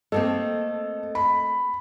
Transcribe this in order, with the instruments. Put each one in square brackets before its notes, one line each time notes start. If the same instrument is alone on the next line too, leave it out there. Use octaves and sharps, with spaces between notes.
[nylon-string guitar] A3 A#3 C4 [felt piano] A4 [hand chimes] D#5
[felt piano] B5